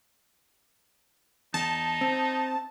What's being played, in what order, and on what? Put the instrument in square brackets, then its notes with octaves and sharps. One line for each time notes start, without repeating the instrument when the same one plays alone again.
[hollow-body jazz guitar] E2 [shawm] D#4 [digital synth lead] A5
[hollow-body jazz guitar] C4